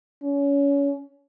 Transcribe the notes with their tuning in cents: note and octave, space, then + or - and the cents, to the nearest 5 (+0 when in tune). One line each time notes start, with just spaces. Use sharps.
C#4 +25